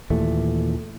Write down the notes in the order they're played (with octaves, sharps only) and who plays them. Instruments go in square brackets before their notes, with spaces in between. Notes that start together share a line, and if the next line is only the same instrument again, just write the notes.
[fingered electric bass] D#2 A#2 E3 A3